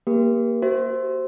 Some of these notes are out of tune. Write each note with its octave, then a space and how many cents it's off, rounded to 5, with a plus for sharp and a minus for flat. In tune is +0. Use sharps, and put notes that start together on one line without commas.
A#3 +0 G4 +25 A#4 +40
F#4 +35 C5 +0 E5 +0